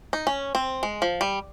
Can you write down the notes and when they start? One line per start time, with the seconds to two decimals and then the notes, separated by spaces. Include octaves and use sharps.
0.13 D#4
0.27 C#4
0.55 C4
0.83 G#3
1.02 F3
1.21 G3